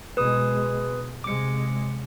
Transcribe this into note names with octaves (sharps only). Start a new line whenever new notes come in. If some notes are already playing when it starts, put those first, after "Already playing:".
B2 G#3 B4 D#6
C3 G#3 D6 C#7